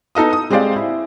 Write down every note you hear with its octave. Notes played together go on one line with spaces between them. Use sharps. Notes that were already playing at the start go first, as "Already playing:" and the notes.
B3 D#4 A4 D#5 D#6
D#6
G#3 C4 G4 C5 D5 F5
E4